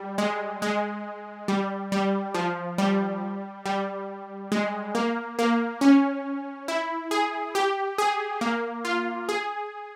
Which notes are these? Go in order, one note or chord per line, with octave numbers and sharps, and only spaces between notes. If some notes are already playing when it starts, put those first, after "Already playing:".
Already playing: G3
G#3
G#3
G3
G3
F3
G3
G3
G#3
A#3
A#3
C#4
E4
G#4
G4
G#4
A#3
F4
G#4